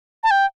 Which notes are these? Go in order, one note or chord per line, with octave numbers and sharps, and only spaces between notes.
A5
G5